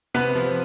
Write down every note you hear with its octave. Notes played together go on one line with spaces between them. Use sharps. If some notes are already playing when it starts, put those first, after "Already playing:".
C3 B3 B4
F3